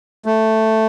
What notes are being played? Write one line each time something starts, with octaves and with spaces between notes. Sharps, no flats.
A3